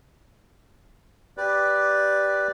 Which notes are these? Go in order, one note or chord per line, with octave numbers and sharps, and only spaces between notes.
G4 B4 D5